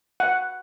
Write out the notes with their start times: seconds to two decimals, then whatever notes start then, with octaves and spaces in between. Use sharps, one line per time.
0.20 F#5